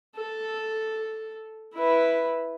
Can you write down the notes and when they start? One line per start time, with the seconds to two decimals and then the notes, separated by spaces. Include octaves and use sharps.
0.16 A4
1.74 E4 B4